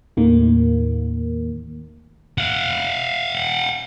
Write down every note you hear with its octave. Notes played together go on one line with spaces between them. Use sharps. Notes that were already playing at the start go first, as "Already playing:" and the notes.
D#2 A2 D#3 A#3
F5 F#5